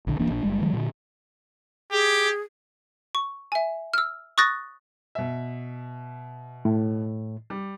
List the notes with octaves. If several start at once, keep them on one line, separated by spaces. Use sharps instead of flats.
A#1 D3
D1 E3 A#3 D4
A#1 D4
F#1 G3 G#3
D#3 E3 F#3 G#3
A#2 D3
G4 G#4
C#6
E5 G#5
E6 F6
C#6 D#6 F#6 A6 A#6
B2 E5
A2
G3